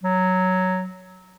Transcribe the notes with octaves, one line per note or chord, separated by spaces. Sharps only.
F#3